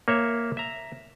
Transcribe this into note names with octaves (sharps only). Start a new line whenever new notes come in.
A#3 C#5 E5
E5 A#5